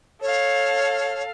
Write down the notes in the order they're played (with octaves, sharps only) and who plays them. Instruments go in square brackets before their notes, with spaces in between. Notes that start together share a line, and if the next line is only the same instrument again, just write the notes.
[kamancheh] A4 F5 [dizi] C#5